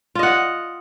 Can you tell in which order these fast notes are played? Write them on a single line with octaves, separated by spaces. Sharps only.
F4 D#5 F#5